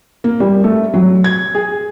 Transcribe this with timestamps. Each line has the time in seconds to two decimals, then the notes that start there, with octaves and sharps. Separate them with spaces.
0.24 A#3
0.40 G3
0.64 A3
0.94 F#3
1.24 G#6
1.55 G#4